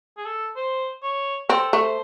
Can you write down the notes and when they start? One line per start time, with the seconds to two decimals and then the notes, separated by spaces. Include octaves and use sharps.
0.17 G#4
0.25 A4
0.56 C5
1.03 C#5
1.49 C4 A4
1.73 A3
1.81 C5